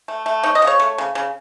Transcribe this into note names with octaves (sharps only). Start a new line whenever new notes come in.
A3
A3
D#4 C#5
D#5
C#3
C#5
A3
C#3
C#3